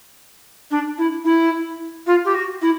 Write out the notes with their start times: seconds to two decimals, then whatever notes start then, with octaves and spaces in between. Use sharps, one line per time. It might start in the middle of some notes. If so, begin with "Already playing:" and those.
0.71 D4
0.98 E4
1.25 E4
2.07 F4
2.25 G4
2.34 F#4
2.62 E4